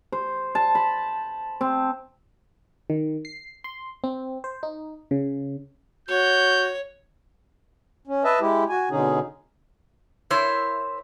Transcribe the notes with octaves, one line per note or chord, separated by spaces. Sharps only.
C5
A5
B5
C4
D#3
C7
C6
C4
C5
D#4
C#3
F#4 C#5 G6
C#4
B4 D#5 E5 A5
G#3 E4 G4
F#4 G#5
B2 D3 C#4 D#4 G#4
E4 A#4 C5 C#5